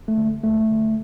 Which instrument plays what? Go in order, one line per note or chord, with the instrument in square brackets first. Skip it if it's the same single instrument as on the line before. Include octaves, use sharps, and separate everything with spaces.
[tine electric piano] A3
D3
D2 A3
D3